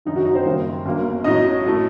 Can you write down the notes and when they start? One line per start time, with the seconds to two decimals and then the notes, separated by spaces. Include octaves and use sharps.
0.05 F#1 F#2 D#3 D#4
0.15 F#3 F#4
0.25 D#4
0.35 C4 C5
0.45 F#1 F#2 D#3 G3 A#3
0.85 G1 F#2 F#3 A#3
1.24 A1 A2 F#3 D#4 D#5
1.66 A2 F#3 A3